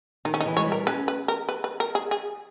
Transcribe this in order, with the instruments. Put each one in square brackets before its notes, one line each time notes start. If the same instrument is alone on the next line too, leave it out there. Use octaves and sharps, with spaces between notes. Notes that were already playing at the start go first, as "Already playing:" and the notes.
[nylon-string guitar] D#3 [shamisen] D#4
[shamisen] C#4
D#4
[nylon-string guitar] E3
[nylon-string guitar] G#3 [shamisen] C#5
[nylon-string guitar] G3 [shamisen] A#4
[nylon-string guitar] C#4 [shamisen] B4
[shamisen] B4
A#4
B4
B4
A#4
G#4
G#4